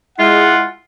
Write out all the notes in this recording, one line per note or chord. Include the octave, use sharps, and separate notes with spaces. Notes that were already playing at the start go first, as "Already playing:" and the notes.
G#3 E4 F4 F#5